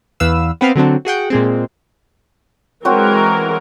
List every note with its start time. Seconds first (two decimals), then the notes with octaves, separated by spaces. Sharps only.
0.20 E2 B4 F5 E6
0.61 B3 C4 B4 F5
0.76 D3 F#3 C4 D4
1.05 F#4 G#4 F#5 G5
1.30 A#2 G#3 C4
2.85 E3 F#3 G#3 C4 F#4 A#4